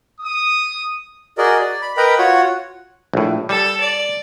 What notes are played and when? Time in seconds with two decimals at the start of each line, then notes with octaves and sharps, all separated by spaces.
0.20 D#6
1.38 F#4 G#4 A#4 D5 D#5
1.62 D5
1.82 B5
1.97 A#4 B4 D#5 G5 A#5 B5
2.19 F4 F#4 C#5 F#5
3.14 A#1 A2
3.49 G3 A4
3.80 D5